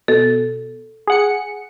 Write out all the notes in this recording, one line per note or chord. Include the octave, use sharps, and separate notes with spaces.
B2 A4
G#4 F#5 C#7